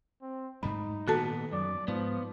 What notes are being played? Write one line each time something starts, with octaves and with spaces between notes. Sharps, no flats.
C4
G#2 G3 A3 D#4 B5
A#2 D#3 B3 F#4 A4 A5
F#2 D5
G#2 F3 B3